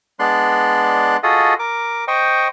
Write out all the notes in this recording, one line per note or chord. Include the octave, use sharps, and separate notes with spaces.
G#3 B3 D4 D5 C6 F#6
F4 F#4 G#4 A4 D#5
A#4 D6
C5 D#5 G5 C#6